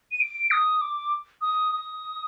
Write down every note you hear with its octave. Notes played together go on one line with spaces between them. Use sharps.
D#7
D7
D#6
D6
D#6
D#6